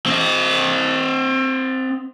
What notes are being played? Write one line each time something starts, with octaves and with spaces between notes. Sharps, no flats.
C4 D#5